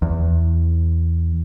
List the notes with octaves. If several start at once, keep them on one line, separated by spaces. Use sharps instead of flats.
E2